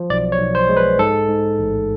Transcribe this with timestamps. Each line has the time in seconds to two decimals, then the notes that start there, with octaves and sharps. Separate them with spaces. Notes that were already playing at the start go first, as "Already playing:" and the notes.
Already playing: F3
0.10 B1 D5
0.32 C#5
0.40 B1
0.55 C5
0.69 G#3
0.77 B4
0.99 G#2 A4
1.29 G#2
1.59 A1